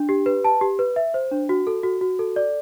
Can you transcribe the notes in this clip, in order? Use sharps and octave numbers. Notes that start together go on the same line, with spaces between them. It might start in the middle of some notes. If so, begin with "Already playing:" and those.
Already playing: D4
G4
B4
A5
G4
B4
E5
C5
D4
F#4
A4
F#4
F#4
A4
D5